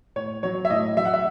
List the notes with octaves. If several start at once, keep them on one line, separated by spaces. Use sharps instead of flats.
A2 C#5
F#3 C#5
E5
A2 D#5
F#3 E5
F#5
E5